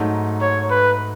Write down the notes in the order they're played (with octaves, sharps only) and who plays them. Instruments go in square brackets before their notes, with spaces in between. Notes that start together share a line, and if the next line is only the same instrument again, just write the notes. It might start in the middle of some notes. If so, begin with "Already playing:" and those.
Already playing: [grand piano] G#2 F#3 A3 D#4
[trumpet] C#5
B4